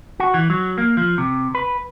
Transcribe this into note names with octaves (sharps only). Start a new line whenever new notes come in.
F#4
E3
F#3
A#3
F3
C3
B4